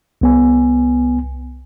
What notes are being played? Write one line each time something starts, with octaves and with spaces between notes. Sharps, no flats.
C2 B3 G#5